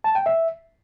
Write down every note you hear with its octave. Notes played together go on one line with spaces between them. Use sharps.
A5
G5
E5